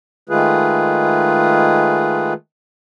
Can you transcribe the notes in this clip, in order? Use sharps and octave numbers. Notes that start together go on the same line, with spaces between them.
D#3 G#3 A3 F4 G#4 B4